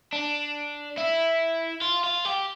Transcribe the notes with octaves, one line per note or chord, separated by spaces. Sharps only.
D4
E4
F4
F4
G4